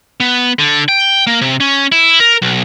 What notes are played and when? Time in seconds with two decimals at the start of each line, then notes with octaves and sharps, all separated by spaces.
0.20 B3
0.59 D3
0.89 G5
1.27 A#3
1.41 C3
1.60 C#4
1.92 E4
2.20 A#4
2.42 B1